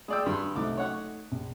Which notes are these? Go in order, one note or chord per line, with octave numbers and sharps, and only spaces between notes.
G#3 D5 G5 D#6 E6
G2 C6
C2 A3 D#4 D6
C#5 F#5 C#6
A#1